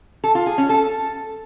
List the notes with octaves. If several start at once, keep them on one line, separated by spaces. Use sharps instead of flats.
A4
F4
G#4
C#4
A4